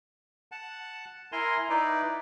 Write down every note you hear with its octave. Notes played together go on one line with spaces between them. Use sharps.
F#5 A5
E4 A#4 G#5 A#5 C6
D#4 E4 B4 D5